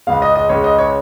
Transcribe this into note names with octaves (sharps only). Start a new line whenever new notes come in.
C#2 C#3 G#3 F5
D#5
D#5
C#2 C#3 G#3 C#5
D#5
C#5